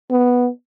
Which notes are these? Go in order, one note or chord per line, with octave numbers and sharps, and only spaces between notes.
B3